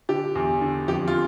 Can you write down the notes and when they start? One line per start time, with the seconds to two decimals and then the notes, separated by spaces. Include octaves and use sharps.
0.09 D3 G4
0.35 E2
0.61 D3
0.88 F2 G4
1.08 F4